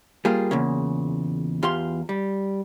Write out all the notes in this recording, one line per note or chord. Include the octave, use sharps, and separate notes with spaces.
G3 A#3 F4 G#4
E2 A#2 C#3
E2 F4 G4 F5 C6
G3